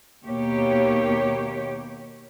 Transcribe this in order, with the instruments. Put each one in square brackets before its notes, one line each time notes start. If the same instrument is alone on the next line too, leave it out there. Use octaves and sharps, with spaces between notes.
[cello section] D#2 B2 A#3 G4 C#5